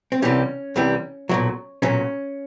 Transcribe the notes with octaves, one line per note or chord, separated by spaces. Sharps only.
C4
C2 C3 E3 G3 C#4
C2 C3 E3 G3
B1 A#2 F#3
B1 A#2 F#3 C#4